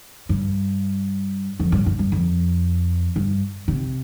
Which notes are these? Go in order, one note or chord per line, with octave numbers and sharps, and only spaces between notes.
G2
F2
G2
G2
G2
F2
G2
C3